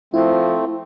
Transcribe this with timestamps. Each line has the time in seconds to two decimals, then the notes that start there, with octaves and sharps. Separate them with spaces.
0.14 F3 A3 C4 E4